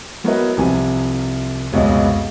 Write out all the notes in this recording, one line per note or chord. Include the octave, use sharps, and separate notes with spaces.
F#3 B3 E4 A#4 B4 D#5
C2 C3 F3 G#5
F1 C#2 F#2 B2 G#3 D#5